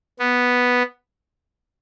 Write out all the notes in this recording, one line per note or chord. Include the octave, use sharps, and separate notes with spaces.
B3